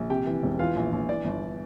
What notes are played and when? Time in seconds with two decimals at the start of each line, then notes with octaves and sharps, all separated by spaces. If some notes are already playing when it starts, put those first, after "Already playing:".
Already playing: A#1
0.10 C3 G4 G5
0.26 E3
0.43 E1
0.59 E3 F4 F5
0.76 A#1
0.92 A#1
1.09 E3 D5
1.25 G1